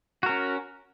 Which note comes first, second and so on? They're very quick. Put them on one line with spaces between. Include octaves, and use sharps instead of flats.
F#4 A#4 C#4